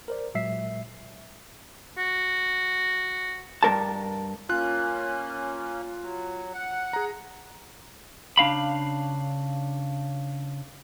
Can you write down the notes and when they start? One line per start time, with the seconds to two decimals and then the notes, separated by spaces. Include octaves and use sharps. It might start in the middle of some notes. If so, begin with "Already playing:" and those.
0.08 A#4 C5 D5
0.34 A#2 F#3 G#3 E5 C7
1.98 F#4
3.63 G2 A#4 A5
4.49 A#3 C#4 F4 F#6
6.01 F#3
6.54 F#5
6.93 G#4 A#5
8.37 C#3 D4 F5 B5